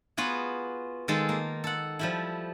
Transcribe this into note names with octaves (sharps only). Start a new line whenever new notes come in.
B3 F4 F#4 G#4
D#3 G#3 F4 A4
A#3
A4 F#5
F3 G3 E4